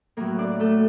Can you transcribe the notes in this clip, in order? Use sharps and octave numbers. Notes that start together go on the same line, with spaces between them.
A2 F#3 A#3 A#4
D4 D5
A3 A4